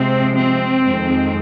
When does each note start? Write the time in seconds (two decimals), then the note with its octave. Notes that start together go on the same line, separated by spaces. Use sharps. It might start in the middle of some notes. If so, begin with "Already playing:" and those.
Already playing: C3 F3 G#3 C4
0.36 C4
0.82 F2 D#3 G#3